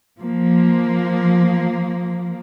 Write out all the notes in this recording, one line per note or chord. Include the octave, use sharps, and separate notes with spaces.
F3 A#3